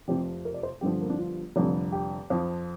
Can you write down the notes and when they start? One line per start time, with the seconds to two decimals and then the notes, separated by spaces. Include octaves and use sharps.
0.08 F1 F2 C3 F3 G4
0.45 A#4
0.54 D5
0.63 C5
0.81 G1 G2 D3 F3 G4
1.01 A#3
1.10 D4
1.19 F4
1.56 F1 F2 D3 G3
1.92 G4
2.30 F2 F3